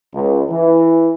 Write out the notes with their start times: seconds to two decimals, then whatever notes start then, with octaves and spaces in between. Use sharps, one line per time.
0.14 C#2
0.50 E3